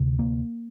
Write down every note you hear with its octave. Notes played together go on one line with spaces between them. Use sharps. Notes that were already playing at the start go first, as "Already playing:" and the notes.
Already playing: D2 C3
A#3